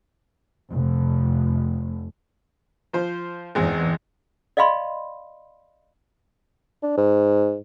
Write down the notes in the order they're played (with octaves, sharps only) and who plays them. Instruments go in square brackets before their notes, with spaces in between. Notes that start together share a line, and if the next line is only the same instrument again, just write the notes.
[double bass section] F1
[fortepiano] F3 C5
[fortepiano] G#1 G#3 C4 [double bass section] E2
[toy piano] D5 D#5 F5 G#5 B5 C6
[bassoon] D4
G#2